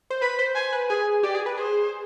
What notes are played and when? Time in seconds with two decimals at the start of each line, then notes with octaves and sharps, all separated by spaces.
0.10 C5
0.22 B4 B5
0.39 C5
0.55 C5 G#5
0.73 B4
0.89 G#4 G#5
1.23 G4 D5
1.35 G#4
1.46 B4
1.57 G#4 C5